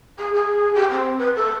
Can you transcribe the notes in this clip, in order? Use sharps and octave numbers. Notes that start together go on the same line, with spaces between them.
G#4
G#4
G4
C4
B4
A4